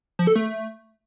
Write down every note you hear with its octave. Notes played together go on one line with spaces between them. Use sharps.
F3
A4
A3